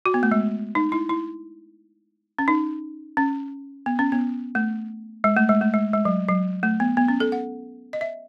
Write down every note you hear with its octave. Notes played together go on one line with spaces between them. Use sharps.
F#4
B3
A3
G#3
D#4
E4
E4
C#4
D#4
C#4
B3
C#4
B3
A3
G#3
A3
G#3
A3
G#3
G#3
F#3
F#3
A3
B3
B3
C#4
A4
F#5
D#5
E5